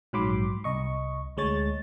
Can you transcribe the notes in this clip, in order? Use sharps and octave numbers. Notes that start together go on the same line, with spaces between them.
A#1 G#2 F#3 B5 C6 D6
C2 D#5 C#6
D2 G#3 C#5 A6